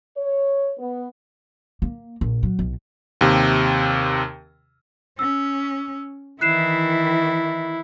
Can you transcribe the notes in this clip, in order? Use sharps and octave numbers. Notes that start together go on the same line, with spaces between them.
C#5
B3
A#3
A#1
F#3
B1
D#2 C3
C#4 E6
D#3 E3 E4 F#6 C7 E7